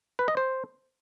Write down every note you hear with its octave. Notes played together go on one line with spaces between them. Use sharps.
B4
D#5
C5